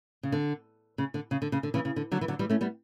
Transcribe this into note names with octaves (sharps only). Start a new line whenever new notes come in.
C#3
D3
C#3
D3
C#3
D3
C#3
D3
C#3 E3
C#3
D3
D3 F#3
E3
D3 F#3
E3 G3
A3 C#4
G3 B3